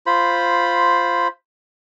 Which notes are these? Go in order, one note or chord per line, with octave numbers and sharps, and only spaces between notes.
F4 C5 B5